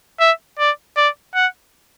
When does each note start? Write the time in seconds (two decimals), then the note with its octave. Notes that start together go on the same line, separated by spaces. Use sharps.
0.20 E5
0.59 D5
0.97 D5
1.35 F#5